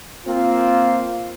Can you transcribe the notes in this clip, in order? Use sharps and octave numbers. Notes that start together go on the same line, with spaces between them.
A#3 C4 F4